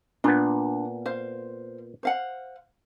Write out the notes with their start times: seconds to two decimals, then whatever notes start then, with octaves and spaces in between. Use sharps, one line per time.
0.24 A#2 B3 D4
1.06 C5 F5
2.03 C5 F5 F#5